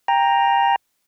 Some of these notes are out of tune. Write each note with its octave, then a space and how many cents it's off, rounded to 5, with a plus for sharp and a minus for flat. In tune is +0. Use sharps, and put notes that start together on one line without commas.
G5 +20 A#5 +0